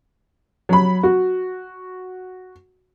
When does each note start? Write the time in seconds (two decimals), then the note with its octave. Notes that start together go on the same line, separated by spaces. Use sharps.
0.69 F#3 B5
1.03 F#4